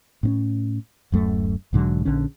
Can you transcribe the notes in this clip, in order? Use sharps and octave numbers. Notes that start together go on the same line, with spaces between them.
A2 C4 C#4
D1 F#2 A3
B1 G#2 D3 F#3
A#1 D3 C#4